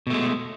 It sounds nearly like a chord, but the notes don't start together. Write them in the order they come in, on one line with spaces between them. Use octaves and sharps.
B2 A3 G#3